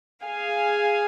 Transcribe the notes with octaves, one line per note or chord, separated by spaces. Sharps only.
G#4 F5 G#5